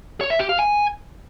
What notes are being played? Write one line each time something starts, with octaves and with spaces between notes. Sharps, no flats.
C#5
E5
G4
F5
G#5